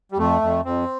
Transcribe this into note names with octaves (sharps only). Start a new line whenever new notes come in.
G3
F2 A3
F2
F2 C4